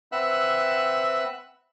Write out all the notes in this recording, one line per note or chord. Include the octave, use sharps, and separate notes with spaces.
C4 B4 E5 F#5 E6 F#6